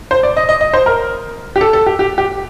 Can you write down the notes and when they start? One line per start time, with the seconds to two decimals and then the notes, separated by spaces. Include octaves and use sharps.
0.11 C5
0.23 D5
0.37 D#5
0.49 D#5
0.61 D#5
0.74 C5
0.86 A#4
1.56 G4
1.61 A4
1.73 A4
1.86 G4
1.99 G4
2.18 G4